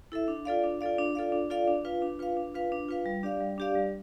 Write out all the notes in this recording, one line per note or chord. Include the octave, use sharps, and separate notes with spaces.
E4 A4 E5
D4
F4 A4 D5 F5
D4
F4 A4 D5 F5
D4
F4 A4 D5 F5
D4
F4 A4 D5 F5
D4
F4 B4 F5
D4
F4 B4 F5
D4
F4 B4 F5
D4
F4 B4 F5
G3
D4 G4 D5 F5
G3
D4 G4 D5 F5
G3